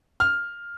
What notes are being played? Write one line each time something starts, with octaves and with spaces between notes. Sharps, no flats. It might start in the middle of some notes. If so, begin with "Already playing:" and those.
F6